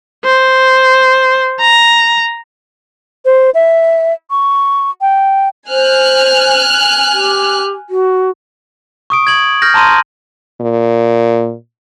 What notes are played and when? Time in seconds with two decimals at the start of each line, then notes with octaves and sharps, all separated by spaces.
0.25 C5
1.60 A#5
3.25 C5
3.54 E5
4.30 C#6
5.01 G5
5.69 C5 G#5 F6 F#6
7.12 G4
7.90 F#4
9.10 C#6 D#6 D7
9.27 G#6 F#7
9.62 F6 G6 A#6
9.74 A5 A#5 C6 D#7
10.61 A#2